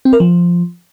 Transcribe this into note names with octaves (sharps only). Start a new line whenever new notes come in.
C4
A#4
F3